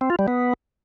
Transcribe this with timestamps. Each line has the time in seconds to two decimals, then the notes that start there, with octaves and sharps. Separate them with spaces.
0.01 C4
0.10 F4
0.19 G3
0.28 B3